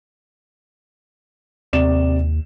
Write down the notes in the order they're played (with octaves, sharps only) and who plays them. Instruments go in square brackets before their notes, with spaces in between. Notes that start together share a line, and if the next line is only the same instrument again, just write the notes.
[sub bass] D#2 [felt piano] C3 D5 E7